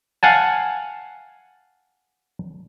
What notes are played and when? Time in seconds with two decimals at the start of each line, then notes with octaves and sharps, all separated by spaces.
0.23 F5 F#5 G#5 A5